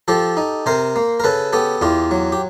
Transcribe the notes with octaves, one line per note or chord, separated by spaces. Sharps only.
F3 G4 A4
D#4
C3 A#4 C5
A#3
A#4
C#3 A4 B4
B3 G4 A4
E2 F4 G4
F#3
G4